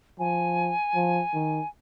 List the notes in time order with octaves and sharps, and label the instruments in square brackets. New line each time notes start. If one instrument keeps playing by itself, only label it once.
[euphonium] F3 [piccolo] G#5
[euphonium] F3
D#3